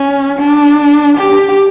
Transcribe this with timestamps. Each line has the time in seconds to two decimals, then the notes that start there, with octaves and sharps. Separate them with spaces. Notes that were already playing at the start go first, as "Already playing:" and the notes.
Already playing: C#4
0.39 D4
1.18 G4